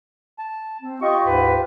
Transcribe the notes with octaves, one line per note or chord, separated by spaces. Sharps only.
A5
C4
F4 G4 D#5 C#6
D2 G#2 B4